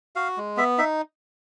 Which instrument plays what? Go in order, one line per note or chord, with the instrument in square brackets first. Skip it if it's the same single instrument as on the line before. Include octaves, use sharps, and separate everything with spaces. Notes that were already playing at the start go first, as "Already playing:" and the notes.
[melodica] F#4 F5
G#3
B3 E5
D#4 E5